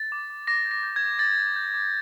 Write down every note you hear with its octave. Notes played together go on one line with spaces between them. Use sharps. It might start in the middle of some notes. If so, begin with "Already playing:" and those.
Already playing: A6
D6
D6
D6 A#6
G6
A#6
G6
G6 G#6
D6 A6
G6
G6
D6